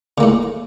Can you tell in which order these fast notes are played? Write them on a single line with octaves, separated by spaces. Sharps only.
C#3 A#3 A2